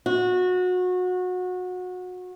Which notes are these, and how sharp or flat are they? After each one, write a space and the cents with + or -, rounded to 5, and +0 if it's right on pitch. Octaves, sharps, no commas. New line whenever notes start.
F#4 -25